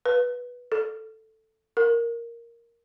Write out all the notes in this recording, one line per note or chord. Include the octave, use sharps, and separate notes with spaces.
B4
A4
A#4